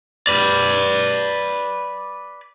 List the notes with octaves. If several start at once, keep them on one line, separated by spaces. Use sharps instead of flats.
B4 D5